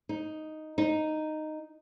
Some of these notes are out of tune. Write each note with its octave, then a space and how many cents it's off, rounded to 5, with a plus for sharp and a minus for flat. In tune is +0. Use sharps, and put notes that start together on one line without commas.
D#4 +0
D#4 -5